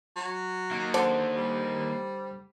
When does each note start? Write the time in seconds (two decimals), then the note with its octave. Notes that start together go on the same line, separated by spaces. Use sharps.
0.16 F#3
0.71 D#3 A#3
0.94 D3 C5
1.36 G3